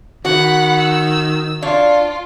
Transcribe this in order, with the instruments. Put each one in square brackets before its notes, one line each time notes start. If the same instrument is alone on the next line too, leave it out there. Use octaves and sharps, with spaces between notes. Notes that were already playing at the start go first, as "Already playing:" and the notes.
[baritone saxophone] D#3 [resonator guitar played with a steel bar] F#4 [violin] F#5 B5
[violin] E6
[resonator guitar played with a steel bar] D4 C#5 [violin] F4